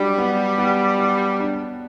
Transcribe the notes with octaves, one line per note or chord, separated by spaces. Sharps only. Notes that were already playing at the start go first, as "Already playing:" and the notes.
Already playing: F#3 G3 D4
B3
B3
B3
D4